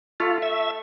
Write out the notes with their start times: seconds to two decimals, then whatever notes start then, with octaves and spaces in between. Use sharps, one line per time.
0.20 A3 F4
0.42 E5